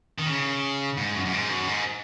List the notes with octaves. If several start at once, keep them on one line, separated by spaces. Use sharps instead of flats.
D#3
C#3
G#2
F#2
F#2
G#2
F#2
G#2